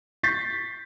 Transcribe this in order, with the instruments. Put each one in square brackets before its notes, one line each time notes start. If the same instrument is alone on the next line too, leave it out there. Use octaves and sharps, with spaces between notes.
[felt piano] C#6 G6 A6 B6 C7